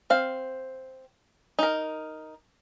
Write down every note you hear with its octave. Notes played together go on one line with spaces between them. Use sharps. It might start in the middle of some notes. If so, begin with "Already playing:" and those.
C4 F5
D#4 A#4